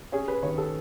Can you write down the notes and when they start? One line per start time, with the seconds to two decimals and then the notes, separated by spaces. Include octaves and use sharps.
0.12 C#4 G#4
0.28 B4
0.43 D#3 C#5
0.58 A4